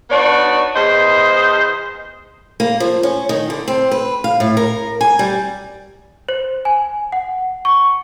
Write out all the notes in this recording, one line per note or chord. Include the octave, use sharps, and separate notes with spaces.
B3 D4 D#4 F#4 C#5 D5
E2 C5 D#5
A#3
F3
C#4
D#3
D3
C4
B4
F5
A2
A#4
G#5
G3
C5
G#5
F#5
C#6